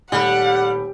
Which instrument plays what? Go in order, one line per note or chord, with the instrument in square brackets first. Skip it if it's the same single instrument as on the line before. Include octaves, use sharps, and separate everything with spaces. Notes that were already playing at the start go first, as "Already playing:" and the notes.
[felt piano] D#1 A3 B5 [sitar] G3 [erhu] F#5